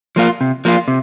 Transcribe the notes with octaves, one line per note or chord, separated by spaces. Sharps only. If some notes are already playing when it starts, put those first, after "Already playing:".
F3 A#3 F4
C3
F3 A#3 F4
C3